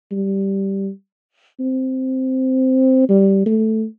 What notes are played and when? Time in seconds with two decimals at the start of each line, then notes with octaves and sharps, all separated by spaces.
0.12 G3
1.60 C4
3.09 G3
3.46 A3